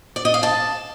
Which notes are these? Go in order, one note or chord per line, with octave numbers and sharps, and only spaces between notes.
D5
D#5
F5
A5